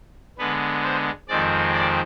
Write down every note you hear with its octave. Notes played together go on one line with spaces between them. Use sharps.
D3 G#3 B3 B4
C5
F2 D#3 G#3 C4 D5
D5